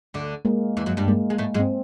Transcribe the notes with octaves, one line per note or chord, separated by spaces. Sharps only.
D2 D3
G#3 A#3
E2 E3
F#2 F#3
G2 G3
G#3 A#3
G#3
A2 A3
G#2 G#3
C4